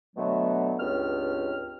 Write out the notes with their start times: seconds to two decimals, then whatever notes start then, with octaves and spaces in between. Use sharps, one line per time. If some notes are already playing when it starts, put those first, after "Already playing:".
0.16 B2 D3 F#3 A3 B3
0.80 C#2 G2 C4 F6